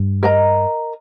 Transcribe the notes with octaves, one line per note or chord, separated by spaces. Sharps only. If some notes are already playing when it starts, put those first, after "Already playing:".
Already playing: G2
A#4 D#5 A#5